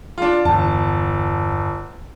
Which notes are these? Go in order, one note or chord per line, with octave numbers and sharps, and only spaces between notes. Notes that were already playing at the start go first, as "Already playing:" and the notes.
D4 F4
G1 E2 A5